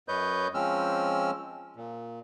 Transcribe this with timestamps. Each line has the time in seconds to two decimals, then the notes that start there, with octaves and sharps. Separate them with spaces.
0.08 F#2 B4 C#5 D#5 G6
0.54 F3 G#3 C4 C#4 E6 F6
1.76 A#2